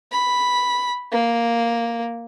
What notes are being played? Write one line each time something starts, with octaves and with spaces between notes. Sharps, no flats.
B5
A#3